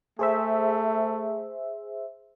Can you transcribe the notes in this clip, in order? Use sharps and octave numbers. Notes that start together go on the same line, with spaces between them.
A3 G#4 C5 E5